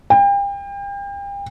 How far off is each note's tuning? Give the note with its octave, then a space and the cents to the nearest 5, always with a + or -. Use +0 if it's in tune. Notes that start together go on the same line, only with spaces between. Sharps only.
G5 +35